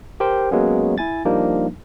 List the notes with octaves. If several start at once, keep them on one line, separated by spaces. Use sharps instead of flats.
G4 A#4 C5 G5
F#3 G#3 A#3 B3 C#4
E4 G#5 A6
F3 G3 A#3 D4 D#4